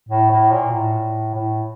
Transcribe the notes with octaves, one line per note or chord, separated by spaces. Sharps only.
A2
A2
A#2
A2
A2